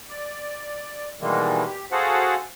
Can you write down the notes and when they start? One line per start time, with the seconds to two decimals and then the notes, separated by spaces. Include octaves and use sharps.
0.09 D5
1.21 B2 D#3 E3 G3 G#3 A#3
1.66 G4
1.92 F#4 G#4 A4 C5 F5 F#5